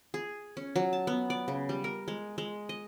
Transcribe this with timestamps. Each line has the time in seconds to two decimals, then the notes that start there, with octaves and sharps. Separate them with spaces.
0.14 G#4
0.57 C#4
0.76 F#3
0.93 A5
1.07 B3
1.30 D5
1.48 C#3
1.69 G3
1.84 A#4
2.08 G#3
2.38 G#3
2.69 D#5